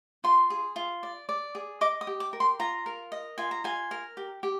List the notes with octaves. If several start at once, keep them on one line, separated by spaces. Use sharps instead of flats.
F4 C6
G#4
F4
D5
D5
G#4
D#5 D6
D#6
G4
D6
A#4
C6
F4 A#5
A#4
D#5
F4 G#5
A#5
F4 G#5
A#4
G4
G4